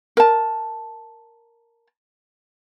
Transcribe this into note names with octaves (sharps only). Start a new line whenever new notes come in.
A#4 A5